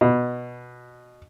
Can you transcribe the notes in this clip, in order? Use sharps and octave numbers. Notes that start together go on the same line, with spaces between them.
B2